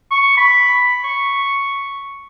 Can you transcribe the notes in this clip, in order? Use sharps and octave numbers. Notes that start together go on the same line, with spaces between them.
C#6
B5
C#6